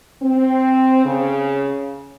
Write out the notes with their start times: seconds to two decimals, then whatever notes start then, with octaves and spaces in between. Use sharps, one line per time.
0.23 C4
1.05 C#3